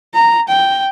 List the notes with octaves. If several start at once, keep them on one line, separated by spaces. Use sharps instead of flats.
A#5
G5